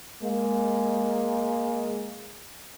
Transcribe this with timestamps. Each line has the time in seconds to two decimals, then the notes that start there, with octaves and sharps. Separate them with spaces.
0.22 G#3 A#3